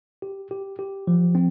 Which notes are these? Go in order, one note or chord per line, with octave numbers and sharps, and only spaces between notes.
G4
G4
G4
F3
C4